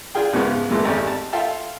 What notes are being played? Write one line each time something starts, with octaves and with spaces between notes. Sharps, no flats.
D4 F4 G#4 G5
E2 G#2 C#3 F3 B3
A#2 E3 G#3 A3 B3
G#1 F2 A3 G4 D5 G#5
A5
F4 A4 E5 F5 G5 A5